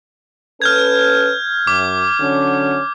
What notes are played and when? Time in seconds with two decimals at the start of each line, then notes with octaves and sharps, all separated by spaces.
0.62 C#4 A4 B4 F6 G6 G#6
1.67 F#2 D6
2.21 D3 F#3 C#4